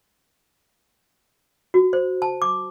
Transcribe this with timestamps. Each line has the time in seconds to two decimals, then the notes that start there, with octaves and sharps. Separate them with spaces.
1.74 F#4
1.93 C5
2.22 A5
2.42 D6